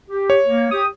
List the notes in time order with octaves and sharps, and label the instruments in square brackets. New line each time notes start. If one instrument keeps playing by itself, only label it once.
[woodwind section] G4
[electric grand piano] C#5
[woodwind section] A#3
G4 D#6